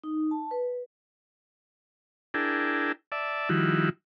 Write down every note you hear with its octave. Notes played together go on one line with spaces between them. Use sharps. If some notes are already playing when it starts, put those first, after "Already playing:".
D#4
A5
B4
D4 E4 G#4 A#4 G5 A5
D5 E5 A5
D#3 F3 G3 E4 F#4